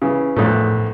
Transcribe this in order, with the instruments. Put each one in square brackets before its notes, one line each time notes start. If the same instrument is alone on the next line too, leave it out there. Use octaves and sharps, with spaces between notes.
[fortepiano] C#3 E3
[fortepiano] A#1 E2 A3 [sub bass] A2